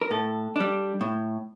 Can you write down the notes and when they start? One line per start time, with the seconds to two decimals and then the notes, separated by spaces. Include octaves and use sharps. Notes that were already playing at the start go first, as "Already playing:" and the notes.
0.01 A#4
0.11 A2 A4
0.56 G3 D4
1.01 A2